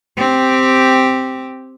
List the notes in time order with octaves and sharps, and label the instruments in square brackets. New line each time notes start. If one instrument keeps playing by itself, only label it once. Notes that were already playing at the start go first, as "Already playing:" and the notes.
[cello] C4 G4